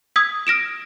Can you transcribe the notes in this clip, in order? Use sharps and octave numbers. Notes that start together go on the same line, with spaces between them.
D#6 E6 G#6 B6
F6 A#6 D7 E7